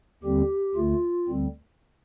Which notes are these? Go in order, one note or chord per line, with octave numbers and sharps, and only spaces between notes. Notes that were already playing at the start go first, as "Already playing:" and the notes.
D#2 D3 G3 C4 G4
D2 D3 A3 F4
D2 D3 G3 C4